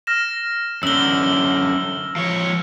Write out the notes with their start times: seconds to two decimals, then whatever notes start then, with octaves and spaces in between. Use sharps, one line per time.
0.07 F6 A#6 E7
0.83 F#2 D3 E6 G7
2.16 F3 C#5